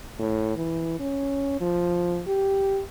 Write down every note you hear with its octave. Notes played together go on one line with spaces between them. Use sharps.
A2
E3
C#4
F3
G4